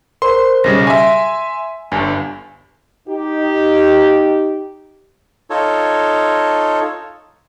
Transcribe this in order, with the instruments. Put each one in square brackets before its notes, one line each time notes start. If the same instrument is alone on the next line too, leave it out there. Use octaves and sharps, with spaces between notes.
[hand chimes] A#4 C5 [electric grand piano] C6
[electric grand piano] B1 C#3 G3 [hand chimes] A#6
[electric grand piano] E5 G#5 [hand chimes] C6
[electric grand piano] G1 G2 [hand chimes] G#5
[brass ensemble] D#4 G4
[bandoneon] D#4 F4 A4 C#5